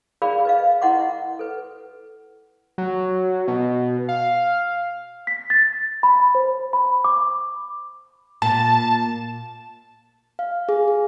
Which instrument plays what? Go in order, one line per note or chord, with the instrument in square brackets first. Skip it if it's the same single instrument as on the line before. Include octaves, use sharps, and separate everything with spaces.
[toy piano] G#4 A#4 D5 F5 B5
B4 D#5 F5
E4 A#4 D#5 F#5 C6 D6
A4 B4
[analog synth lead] F#3
B2
F5
[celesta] B6
A6
B5
C5
B5
D6
[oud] A#2 [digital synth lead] A5
[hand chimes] F5
G#4
G#4